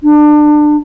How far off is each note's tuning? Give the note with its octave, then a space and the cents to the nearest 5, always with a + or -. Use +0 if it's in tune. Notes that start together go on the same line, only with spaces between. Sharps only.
D4 +25